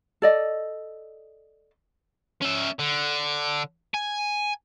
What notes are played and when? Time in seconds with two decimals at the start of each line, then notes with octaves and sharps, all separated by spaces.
0.22 A4 D5 D#5
2.42 C#4 E5
2.79 D3
3.94 G#5